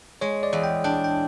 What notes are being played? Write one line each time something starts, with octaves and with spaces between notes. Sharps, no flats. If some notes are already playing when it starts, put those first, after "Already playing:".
G#3 C#5
D5
E2
G5
D4 G5
G5